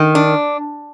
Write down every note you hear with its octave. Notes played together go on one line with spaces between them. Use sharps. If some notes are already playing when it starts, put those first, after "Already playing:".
Already playing: D#3
D4